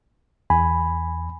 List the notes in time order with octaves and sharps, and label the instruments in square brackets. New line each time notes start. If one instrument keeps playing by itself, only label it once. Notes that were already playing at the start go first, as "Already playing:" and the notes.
[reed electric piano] E2 G#5 B5